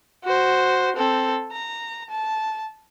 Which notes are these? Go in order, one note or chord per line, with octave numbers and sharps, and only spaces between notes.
F#4 C5
C4 A4
A#5
A5